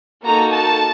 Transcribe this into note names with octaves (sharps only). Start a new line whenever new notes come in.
A#3 D#4 F#4 A4 A#5
A5